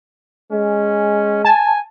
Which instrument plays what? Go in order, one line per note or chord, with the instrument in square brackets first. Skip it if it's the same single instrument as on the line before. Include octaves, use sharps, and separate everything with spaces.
[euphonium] G#3 [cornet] C#4
[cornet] G#5 [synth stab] A5